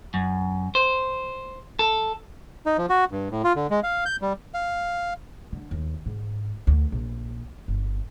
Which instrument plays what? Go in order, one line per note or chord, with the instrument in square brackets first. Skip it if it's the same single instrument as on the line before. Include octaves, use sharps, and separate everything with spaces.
[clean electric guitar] F#2
C5
A4
[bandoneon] D#4
F3
F#4
G2
A2
F4
D3
G#3
F5
G6
G3
[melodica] F5
[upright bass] D3
D#2
G#2
D2
A#1
G1